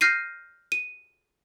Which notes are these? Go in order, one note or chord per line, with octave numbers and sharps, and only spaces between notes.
F6 G6 A#6 C7 D#7
D#7